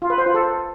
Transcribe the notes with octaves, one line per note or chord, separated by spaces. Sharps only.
F4
B4
C5
F4
A4